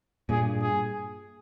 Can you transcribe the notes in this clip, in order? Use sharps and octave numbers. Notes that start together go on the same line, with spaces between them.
G2 A#2 G#4
G#4